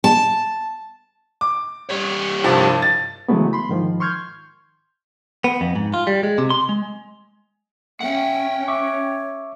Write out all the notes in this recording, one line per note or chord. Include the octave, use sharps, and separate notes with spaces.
A5
D6
G3 C#5
C2 G2 F3
A6
C#3 E3 F#3 G#3 A3 B3
B5 C6
G#2 D#3 F3
C6 C#6 F6 G6 G#6
B3
F2
G#2
F4
G3
G#3
C3
C6
G#3
C#4 E5 F#5 G5
C#5 E5 C#6 D6